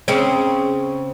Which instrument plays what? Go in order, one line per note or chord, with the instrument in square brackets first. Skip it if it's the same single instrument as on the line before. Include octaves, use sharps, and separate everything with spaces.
[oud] C#3 C4 C#4